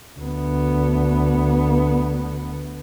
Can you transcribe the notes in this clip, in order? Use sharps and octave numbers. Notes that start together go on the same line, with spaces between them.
D2 B3